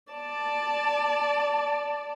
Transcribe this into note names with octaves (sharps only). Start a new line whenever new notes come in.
D5 A5